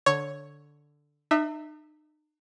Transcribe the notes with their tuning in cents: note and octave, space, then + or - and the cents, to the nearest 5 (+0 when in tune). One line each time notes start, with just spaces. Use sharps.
D3 +0 C#5 +0
D#4 -40 E5 -10